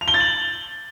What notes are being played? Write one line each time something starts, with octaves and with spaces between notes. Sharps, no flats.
F7
G7
A6
F#7